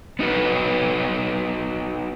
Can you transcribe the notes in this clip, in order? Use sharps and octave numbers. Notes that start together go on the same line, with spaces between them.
B3 D#4 F#4 B4